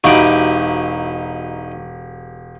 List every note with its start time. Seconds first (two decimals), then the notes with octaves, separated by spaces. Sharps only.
0.04 E1 D#4 E4 F#4 G4 F5 C#6 D7